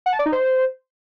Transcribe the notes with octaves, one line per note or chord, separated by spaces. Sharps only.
F#5
A5
D5
D#4
C5